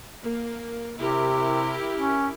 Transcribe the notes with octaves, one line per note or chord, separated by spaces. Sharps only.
A#3
C3 E4 G4 A#4
C#4